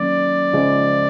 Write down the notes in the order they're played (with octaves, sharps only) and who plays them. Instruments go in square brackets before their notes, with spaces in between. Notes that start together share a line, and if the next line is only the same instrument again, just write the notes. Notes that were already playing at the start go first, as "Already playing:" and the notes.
Already playing: [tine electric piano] D#3 F#3 A#3 C#4 [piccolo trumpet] D5
[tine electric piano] C#3 F3 G#3